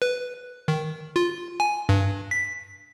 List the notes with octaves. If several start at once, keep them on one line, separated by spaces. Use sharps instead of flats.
B4
D#3
F4
G#5
G2
B6